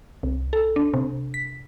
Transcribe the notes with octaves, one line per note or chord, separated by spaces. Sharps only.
C2
A4
D4
C3
B6